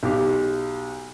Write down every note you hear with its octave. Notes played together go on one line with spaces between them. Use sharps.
B1 G4